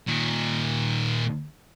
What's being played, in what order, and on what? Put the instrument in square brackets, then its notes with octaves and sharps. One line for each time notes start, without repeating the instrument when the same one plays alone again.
[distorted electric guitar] A#2 D#3